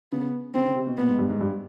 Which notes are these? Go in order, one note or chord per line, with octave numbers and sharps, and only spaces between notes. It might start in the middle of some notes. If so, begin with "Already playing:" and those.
C#3 B3
C#3 C4
C#3
C3
B2
A#2 B3
G#2
G2
G#2
G2